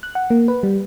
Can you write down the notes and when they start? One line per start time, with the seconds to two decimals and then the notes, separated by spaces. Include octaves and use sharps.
0.03 F#6
0.15 F#5
0.30 A#3
0.48 B4
0.63 G3